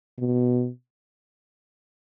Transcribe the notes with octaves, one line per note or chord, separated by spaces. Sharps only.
B2